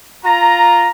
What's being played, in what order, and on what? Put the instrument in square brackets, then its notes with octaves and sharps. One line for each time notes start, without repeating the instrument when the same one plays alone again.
[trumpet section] F4 A#5